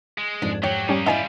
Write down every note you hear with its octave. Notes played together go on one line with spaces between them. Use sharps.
G#3
F2 G#2 D4
F#3 G4 C#5
G3 A#3 C#4 D#4
G3 E4 F4 C5 D5 D#5 F5 G#5